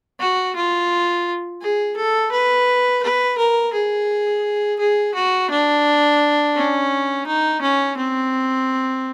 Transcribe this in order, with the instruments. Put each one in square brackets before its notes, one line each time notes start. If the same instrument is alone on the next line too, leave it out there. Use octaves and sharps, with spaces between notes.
[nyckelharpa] F#4
F4
G#4
A4
B4
B4
A#4
G#4
G#4
F#4
D4
C#4
D#4
C#4
C4